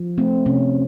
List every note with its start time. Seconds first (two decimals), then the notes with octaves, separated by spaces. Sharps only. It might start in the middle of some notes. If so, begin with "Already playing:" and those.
Already playing: F3
0.18 A3 C4
0.46 C3 C#4